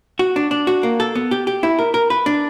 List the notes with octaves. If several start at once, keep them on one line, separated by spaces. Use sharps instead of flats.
F#4
D4
D4
F#4
A#3
A4
B3
G4
G4
E4
A#4
A#4
B4
D4